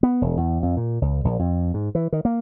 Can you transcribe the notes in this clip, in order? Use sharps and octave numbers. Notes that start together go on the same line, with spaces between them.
B3
E1
E2
F2
A#2
C#2
A#1
F2
G#2
E3
D#3
A#3